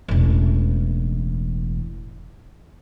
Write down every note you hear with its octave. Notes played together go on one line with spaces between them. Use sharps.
E1 A1